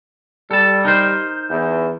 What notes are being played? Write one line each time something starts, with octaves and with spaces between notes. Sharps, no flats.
G3 A4 A5
D#4 A#4 C5
E2